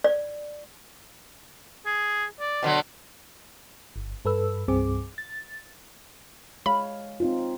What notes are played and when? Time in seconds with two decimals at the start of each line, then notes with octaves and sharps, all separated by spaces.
0.04 D5
1.86 G#4
2.40 D5
2.63 B2 D3 F#3
3.96 G1
4.25 G2 A4 B4 E6
4.68 C2 G2 C4 G#4 D6
5.18 A6
6.66 G#3 C#5 F5 B5
7.20 C4 D#4 F4